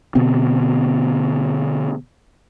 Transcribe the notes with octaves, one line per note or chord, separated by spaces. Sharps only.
B2 D3 B3 C4